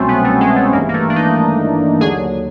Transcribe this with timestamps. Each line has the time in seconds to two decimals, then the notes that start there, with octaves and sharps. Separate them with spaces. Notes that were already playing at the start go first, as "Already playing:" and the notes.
Already playing: C2 B2 F#3 A3 C4 C#4
0.08 B3
0.24 A3
0.41 G#3
0.56 A3
0.73 G#1 G2 E3 A#3
0.89 A#3
0.94 A3
1.10 D4
1.16 D#4
2.01 D#2 D3 F#3 G#4